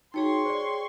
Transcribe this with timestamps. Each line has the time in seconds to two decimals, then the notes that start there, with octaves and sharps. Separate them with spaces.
0.14 D#4 F#4 G#4 C#5 G5 C6 C#6
0.45 C5 D5